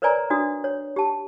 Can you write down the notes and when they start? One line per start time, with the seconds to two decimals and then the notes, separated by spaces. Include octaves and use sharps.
0.02 A#4 B4 C#5 D5 G#5 A#5
0.30 D4 F#4 D#6
0.64 C#5
0.96 G4 A5